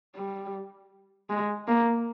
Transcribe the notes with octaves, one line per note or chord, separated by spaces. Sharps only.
G3
G#3
A#3